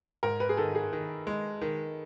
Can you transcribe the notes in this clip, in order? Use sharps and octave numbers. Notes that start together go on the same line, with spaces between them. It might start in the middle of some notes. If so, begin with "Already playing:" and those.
G#2 A#4
B4
G#4
D#3 A4
G#4
D#3
G#3
D#3